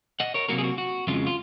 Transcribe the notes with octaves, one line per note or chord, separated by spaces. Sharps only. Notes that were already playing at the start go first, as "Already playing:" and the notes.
D#5 F#5
A#4 C#5
C3 F#3 A#3 F#4 A#4
G#4
F#4
F#4
F2 C#3 G#3 F4
F4